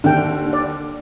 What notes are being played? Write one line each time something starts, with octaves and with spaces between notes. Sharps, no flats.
D#2 D3 D4 G5
D5